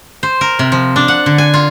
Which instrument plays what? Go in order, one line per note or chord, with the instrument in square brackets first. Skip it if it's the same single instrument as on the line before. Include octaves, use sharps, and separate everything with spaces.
[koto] C5
A#4
C3
F3
D4
F#5
D3
G#5
F4